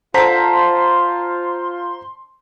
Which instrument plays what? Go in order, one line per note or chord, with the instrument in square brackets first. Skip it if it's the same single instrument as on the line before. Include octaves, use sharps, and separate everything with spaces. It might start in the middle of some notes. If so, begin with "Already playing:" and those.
[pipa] D3 A4 [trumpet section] F4 [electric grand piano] C5 A#5 B6 [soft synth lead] C6